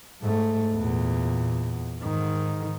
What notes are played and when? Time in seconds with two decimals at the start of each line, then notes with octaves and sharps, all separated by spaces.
0.22 G#2 A3
0.75 E2 A#2
2.02 G#2 D#3